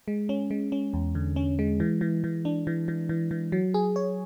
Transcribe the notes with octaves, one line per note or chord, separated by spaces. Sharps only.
G#3
C#4
G#3
C#4
E2
D3
C#4
G#3
E3
E3
E3
D4
E3
E3
E3
E3
F#3
G#4
C#5